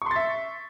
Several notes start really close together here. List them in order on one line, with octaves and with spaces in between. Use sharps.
C#6 C6 A6 E5